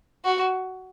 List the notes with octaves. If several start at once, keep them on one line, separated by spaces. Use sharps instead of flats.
F#4